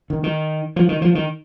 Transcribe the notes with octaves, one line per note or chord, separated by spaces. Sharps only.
D#3
D#3
F3
D#3
F3
D#3